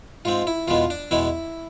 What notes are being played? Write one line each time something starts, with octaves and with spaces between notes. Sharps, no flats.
G#2 G#3 C4 F4
E4
E2 B2 G#3 B3 F4
D4
E2 B2 G#3 B3 E4